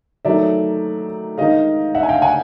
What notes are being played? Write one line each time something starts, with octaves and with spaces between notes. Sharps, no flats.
D#3 F#3 A3 D5 E5
D#3 G#3 D#5 F5
E5 F#5
G#5
F5 G5
F#5 G#5